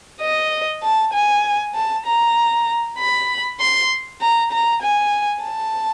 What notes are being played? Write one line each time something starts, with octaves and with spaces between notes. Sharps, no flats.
D#5
A5
G#5
A5
A#5
B5
C6
A#5
A#5
G#5
A5